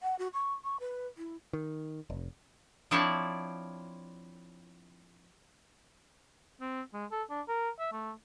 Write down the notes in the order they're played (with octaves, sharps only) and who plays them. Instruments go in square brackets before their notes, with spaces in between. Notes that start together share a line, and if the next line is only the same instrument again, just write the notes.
[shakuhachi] F#5
F#4
C#6
C#6
B4
E4
[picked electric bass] D#3
F1
[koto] F3 C4 D4 E4 C#5 D5
[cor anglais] C4
G#3
A4
D4
A#4
E5
A3